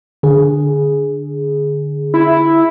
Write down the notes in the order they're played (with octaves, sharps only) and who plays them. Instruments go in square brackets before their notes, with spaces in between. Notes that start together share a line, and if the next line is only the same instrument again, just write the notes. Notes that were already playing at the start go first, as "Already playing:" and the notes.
[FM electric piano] D3 G#4
[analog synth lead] E4